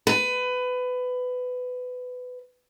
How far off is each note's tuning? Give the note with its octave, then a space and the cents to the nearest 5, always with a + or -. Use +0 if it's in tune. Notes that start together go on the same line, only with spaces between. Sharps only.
B4 +20